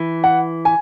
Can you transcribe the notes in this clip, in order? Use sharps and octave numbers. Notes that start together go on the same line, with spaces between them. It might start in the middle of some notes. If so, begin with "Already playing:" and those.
Already playing: E3
F#5
G#5